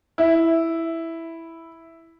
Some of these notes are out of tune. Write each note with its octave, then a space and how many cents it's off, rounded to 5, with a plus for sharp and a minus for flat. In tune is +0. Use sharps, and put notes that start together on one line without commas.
E4 +0